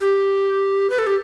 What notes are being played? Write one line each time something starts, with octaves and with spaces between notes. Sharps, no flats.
G4
B4
A4
G4